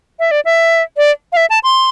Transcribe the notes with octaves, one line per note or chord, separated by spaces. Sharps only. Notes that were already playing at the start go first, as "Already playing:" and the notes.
E5
D5
E5
D5
F5
E5
A5
C6